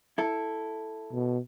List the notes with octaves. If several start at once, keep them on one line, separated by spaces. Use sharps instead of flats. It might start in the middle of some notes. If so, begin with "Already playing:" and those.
E4 A4
B2